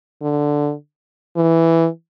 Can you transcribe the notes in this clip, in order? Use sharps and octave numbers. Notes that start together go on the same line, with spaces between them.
D3
E3